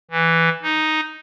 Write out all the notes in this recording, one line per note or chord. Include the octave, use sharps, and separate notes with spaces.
E3
D#4